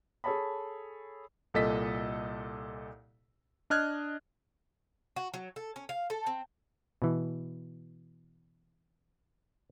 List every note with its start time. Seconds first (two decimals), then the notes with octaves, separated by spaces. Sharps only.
0.24 G#4 A4 C#5 A5 B5
1.54 C2 A#2 A4 D#5 B6
3.70 D4 D#5 F6 F#6 G#6
5.16 F#4
5.34 F#3
5.56 A4
5.76 C#4
5.89 F5
6.10 A4
6.27 C4
7.02 B2 E3